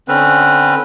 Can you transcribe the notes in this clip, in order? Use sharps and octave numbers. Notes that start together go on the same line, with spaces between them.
D3 C4 C#4 B4